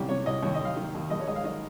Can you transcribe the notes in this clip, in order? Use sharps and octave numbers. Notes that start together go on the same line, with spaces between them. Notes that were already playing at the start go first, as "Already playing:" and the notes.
Already playing: C2 D#3 C#4 G4
C3 C#5
C2 D#5
D#2 C#5
D#5
D#2 F5
D#3
D#2
A#1 D#5
C#5
G#2 D#5
F5
D#3 D#5